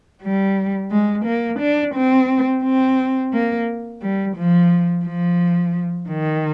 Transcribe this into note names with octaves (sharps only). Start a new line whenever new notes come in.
G3
G#3
A#3
D4
C4
C4
A#3
G3
F3
F3
D#3